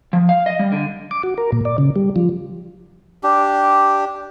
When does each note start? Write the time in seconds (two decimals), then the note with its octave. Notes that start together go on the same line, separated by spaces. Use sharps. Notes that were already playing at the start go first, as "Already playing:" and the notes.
0.13 F3
0.29 F5
0.46 D#5
0.59 G3
0.72 D3
1.11 D6
1.23 F#4
1.38 A#4
1.52 A#2
1.65 D5
1.78 C#3
1.96 G3
2.16 F3
3.23 D4 G4